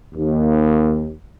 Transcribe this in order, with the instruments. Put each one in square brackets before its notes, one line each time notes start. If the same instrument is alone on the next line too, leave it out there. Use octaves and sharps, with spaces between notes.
[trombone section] D#2